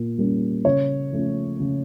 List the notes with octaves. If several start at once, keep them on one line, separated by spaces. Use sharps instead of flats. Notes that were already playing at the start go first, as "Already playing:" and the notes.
Already playing: A#2 A#3
G3 A#3 C#4
C#3 C#5
F3 A3 C#4
C#3